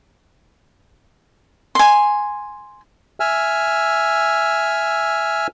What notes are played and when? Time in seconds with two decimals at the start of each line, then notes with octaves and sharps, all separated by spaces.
1.75 G#5 C6
3.20 E5 G#5 E6 F6